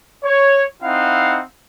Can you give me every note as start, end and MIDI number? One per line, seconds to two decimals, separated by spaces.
0.24 0.65 73
0.82 1.41 60
0.82 1.41 63
0.82 1.41 64
0.82 1.41 77
0.82 1.41 78